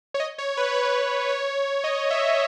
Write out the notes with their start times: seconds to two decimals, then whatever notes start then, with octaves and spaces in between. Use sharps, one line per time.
0.14 C#5
0.20 D#5
0.38 C#5
0.57 B4
0.74 B4
1.02 B4
1.29 C#5
1.84 D#5
2.11 E5